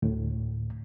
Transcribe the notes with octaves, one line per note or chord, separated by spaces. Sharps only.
D2 A2